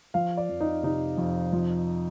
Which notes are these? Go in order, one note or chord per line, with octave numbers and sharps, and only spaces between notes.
F3 F5
D5
F2
D#4
C3 D#4
F2
F3